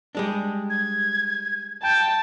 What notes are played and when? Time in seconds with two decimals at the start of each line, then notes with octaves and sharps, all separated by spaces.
0.15 G3 G#3 D4
0.70 G#6
1.82 G5 A5